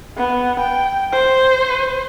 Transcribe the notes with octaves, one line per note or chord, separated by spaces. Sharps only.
B3
G5
C5